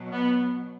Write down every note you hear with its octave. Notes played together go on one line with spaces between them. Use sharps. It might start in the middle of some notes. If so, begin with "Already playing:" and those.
Already playing: B2 F#3
B3